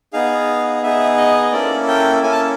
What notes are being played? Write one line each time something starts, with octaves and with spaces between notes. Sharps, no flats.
B3 D#4 G#4 F5
B3 D#4 G#4 E5
D#5
A#3 C#4 E4 A4 D5
G5
A#3 C#4 E4 A4 G#5
A5